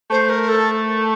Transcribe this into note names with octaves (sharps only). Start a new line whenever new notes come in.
A3 C5
A#4
A4